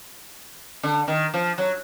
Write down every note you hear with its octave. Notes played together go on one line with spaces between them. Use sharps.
D3
D#3
F3
F#3